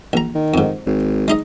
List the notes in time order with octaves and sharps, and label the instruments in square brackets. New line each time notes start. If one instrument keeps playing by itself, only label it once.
[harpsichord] A#1 A#5
[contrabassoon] D#3
[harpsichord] F2 G#2
[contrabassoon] G#1
[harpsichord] G#3 D#4 D#5